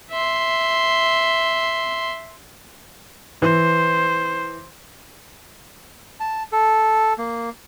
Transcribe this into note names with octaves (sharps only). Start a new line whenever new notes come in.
E5 C6
E3 E4 C5
A5
A4
A#3